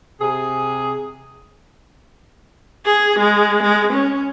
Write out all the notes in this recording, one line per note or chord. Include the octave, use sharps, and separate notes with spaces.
C3 G#4
G#4
G#3
G#3
C#4